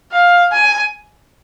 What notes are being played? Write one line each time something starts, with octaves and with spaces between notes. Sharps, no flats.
F5
G#5